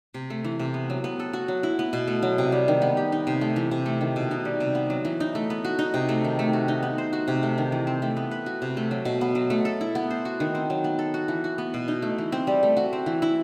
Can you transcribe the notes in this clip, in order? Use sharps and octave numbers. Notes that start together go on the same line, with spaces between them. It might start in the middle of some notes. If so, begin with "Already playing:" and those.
C3
A3
E3
C3
B3
F#3
B3
A4
F#4
F#3
E4
B3
B2
A3
F#3
C3
G3
D#3
B3
G4
D#4
C3
A3
E3
C3
A3
D#3
B2
D#4
G3
C3
B3
F#3
E3
D#4
A3
B3
F#4
D#4
C3
A3
D#3
A3
F#4
D#4
B3
C5
F#4
C3
A3
D#3
E3
C4
A3
B3
B4
F#4
C3
A3
F#3
B2
B3
F#3
A3
A4
E4
B3
C5
F#4
D#3
C4
F#3
B3
A4
F#4
E3
F#4
B3
B2
D#4
A3
E3
C4
G3
A3
F#4
C4
E3
E4